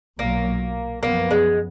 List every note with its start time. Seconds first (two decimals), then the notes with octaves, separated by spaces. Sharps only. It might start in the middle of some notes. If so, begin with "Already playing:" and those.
0.19 B1 A#2 F#3 A#3
1.03 F#2 F3 A#3 B3
1.31 G#3